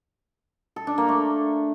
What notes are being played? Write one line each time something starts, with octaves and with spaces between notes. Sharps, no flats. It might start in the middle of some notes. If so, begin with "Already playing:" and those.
A4
D4
A#3
A3